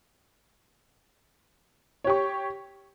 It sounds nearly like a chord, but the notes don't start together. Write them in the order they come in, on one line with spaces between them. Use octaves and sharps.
C#5 G4 C#6